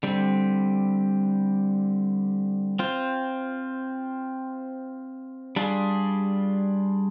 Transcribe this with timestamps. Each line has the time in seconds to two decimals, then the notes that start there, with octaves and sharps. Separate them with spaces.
0.03 D3 G3 C4
2.79 C4 F4 C5
5.56 G3 D4 F4 G#4